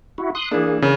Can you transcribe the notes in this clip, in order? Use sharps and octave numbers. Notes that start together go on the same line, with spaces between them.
E4 F#4
C6 D#6 F#6
E3 A#3 D4 G#4
C#3 C#4 A#4